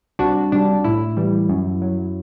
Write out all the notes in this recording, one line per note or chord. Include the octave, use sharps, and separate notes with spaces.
C2 D4 F#4
C3 G3 D4
A2 E4
E3 G3
F#2
F#3